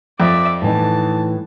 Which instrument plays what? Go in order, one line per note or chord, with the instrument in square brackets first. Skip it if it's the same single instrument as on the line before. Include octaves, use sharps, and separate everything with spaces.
[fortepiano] F2 [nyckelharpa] D5 E5
[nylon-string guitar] A2 E3 D#4 [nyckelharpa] A5